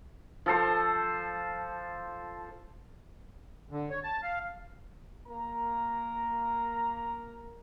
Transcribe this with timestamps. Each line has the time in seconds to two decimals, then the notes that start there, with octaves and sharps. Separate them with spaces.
0.46 F3 A4 C5
3.71 D3
3.90 C#5
4.04 A5
4.23 F5
5.26 A#3 A#4 A#5